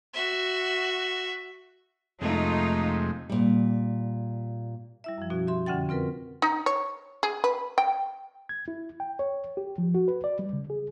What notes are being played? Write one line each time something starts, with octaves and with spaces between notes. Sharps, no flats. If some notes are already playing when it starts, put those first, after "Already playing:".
F#4 E5
F2 C3 G#3 A3 D#4 F4
A#2 G3
G3 E4 E5
F#2 F3
B2 C#4 F#4
G4 E5 C6
F2 D3 C#4 F#5 G5 A6
C4 F4 A#4 B4
D#4
C#5
G#4
B4
G5
G#6
E4
G5
C#5
G4
F3
F#4
B4
D5
G3
C#3
G#4